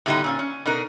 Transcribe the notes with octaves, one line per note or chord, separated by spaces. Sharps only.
A2 D3 G3 A3 B3 D#4
A#2 C#4 F4
C#4
B2 D4 D#4 A#4